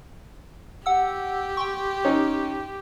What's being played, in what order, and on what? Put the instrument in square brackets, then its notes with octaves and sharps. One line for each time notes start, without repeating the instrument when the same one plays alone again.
[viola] G4 [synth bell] F#5 E6
[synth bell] G5 C6 C#6
[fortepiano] C#4 D#4